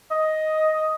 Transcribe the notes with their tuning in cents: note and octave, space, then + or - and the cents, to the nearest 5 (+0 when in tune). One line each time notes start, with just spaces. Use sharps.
D#5 +5